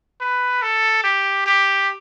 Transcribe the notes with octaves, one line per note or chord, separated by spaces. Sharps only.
B4
A4
G4
G4